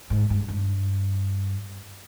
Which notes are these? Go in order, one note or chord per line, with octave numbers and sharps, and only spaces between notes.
G#2
G2
G2